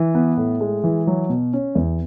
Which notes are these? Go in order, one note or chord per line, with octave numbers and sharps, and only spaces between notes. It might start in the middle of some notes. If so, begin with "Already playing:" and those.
Already playing: E3
B3
A2
G#3
E3
F#3
B2
C#4
E2